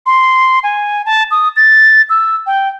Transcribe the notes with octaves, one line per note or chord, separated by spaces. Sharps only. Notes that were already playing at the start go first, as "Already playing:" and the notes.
C6
G#5
A5
D#6
A6
E6
G5